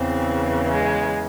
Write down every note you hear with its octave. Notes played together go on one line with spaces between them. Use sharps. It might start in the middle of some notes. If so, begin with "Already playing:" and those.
Already playing: E2 C#3 E3 C4
G#3